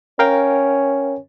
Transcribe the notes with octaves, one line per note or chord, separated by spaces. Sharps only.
C#4 A#4 F5 G5